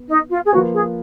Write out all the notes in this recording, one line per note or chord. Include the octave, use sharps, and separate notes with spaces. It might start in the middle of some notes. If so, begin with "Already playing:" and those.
Already playing: B3
D#4
F4
G#4
F3 A#3 F4 F#4 B4
G#4